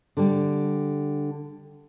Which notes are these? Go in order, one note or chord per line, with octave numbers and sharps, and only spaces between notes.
D3 G3